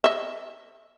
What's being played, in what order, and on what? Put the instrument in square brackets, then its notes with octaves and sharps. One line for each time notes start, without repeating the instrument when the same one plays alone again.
[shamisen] D#5 E5